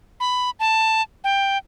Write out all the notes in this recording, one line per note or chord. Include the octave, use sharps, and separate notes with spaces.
B5
A5
G5